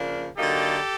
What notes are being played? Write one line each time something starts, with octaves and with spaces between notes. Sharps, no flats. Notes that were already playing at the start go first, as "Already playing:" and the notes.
Already playing: C#3 F3 A#3 D4
D3 F#3 A#3 D#4 G4 A4